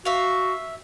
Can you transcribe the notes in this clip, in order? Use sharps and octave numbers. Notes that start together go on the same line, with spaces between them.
F#4 E5 F5